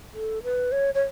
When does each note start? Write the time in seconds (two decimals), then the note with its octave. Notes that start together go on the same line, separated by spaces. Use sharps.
0.14 A4
0.43 B4
0.72 C#5
0.94 C#5